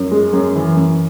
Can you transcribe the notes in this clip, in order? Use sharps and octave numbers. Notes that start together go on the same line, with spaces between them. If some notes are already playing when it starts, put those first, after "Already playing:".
Already playing: F#2
G#3
F#2
E3
F#2